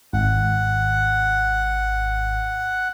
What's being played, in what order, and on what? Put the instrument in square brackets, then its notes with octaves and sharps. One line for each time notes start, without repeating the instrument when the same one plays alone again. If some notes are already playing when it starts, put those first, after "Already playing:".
[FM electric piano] G#1 [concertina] F#5